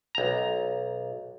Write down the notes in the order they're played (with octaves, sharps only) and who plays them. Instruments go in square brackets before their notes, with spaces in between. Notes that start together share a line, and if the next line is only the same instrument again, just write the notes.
[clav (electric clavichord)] B1 A#5